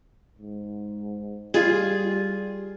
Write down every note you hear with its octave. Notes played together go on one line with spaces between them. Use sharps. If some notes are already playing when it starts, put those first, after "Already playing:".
G#2
G3 F4 G#4